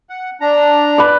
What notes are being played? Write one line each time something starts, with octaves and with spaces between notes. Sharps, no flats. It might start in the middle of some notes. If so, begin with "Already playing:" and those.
F#5
D4 A#5
B4 D5